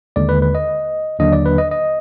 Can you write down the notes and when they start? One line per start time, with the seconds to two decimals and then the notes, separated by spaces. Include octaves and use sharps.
0.16 D#2 D3 G#3 D5
0.29 B4
0.42 B4
0.55 D#5
1.19 D#2 D3 F#3 A#3 D4 D#5
1.33 D5
1.46 B4
1.58 D#5
1.71 D#5